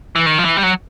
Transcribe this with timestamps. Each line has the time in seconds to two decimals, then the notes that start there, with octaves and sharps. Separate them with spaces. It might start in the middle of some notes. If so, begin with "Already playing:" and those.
0.16 E3
0.26 D#3
0.38 F3
0.45 E3
0.57 G3
0.63 F#3